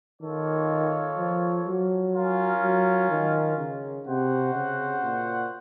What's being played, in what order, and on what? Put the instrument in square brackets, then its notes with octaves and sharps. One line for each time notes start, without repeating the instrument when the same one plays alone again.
[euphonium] D#3 [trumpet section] A#3 F4 A4 C#5
[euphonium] F3
F#3
[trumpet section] C#4 F4 A#4
[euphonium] F#3
D#3
C#3
[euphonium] C3 [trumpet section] F#4 C5 F#5
[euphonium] C#3
A#2